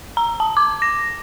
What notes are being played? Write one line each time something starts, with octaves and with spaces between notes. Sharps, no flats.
A#5
A5
D6
A#6